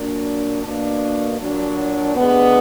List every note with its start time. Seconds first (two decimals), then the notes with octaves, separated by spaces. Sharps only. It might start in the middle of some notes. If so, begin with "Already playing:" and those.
Already playing: A#2 F#3 A#3 D4
0.62 B2 A#3 D4
1.39 A#2 F#3 D4
2.16 D2 D3 G#3 B3